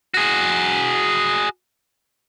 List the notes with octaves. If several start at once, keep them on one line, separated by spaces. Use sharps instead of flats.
F#4 G#4